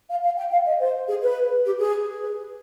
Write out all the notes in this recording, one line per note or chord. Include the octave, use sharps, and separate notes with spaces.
F5
F5
G5
F5
D#5
C5
G#4
B4
G4
G#4
B4